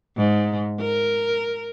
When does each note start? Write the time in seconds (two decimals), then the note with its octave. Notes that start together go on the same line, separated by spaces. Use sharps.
0.17 G#2
0.80 A#4